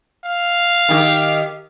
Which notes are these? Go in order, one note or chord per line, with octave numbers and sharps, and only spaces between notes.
F5
D#3 G4